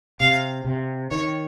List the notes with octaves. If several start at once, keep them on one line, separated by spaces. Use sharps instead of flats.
C3 F5
C3
D#3 C#5